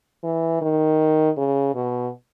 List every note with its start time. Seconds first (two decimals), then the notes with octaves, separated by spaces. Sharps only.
0.24 E3
0.62 D#3
1.37 C#3
1.75 B2